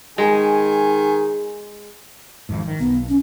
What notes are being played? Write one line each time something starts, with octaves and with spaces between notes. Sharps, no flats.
D#3 G#3 G#4 G#5
G#1 F2 G#2
D#3
B1 B3
C#4